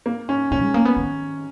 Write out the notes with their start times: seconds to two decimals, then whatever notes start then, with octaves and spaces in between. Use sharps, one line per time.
0.06 A#3
0.29 C#4
0.51 A#2 C#4
0.63 G#3
0.74 A#3
0.85 B3
0.97 D#3